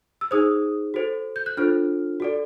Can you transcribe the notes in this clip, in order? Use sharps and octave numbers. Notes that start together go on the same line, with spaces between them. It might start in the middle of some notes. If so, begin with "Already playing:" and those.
E6
D#4 G#4 C5 D#6
F#4 A4 C5
G6
F#6
D4 F4 A4 C5 F6
F#4 A4 D5